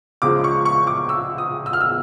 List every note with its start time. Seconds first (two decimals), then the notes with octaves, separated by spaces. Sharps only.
0.22 C#2 C#3 F3 G#3 D6
0.44 C#6
0.65 C#6
0.87 D6
1.09 E6
1.38 D#6
1.66 E6
1.73 F6
1.81 E6